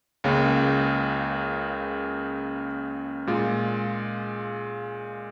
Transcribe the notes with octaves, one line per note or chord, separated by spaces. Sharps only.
C#2 C#3 A#3
A#2 G#3 F4